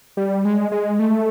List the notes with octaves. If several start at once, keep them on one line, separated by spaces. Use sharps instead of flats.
G3
G#3
G#3
A3